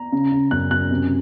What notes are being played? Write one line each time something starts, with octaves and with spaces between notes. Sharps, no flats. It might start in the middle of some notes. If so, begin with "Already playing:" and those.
Already playing: A#5
C#3
C#3
F#2 F#6
F#2 F#6
C3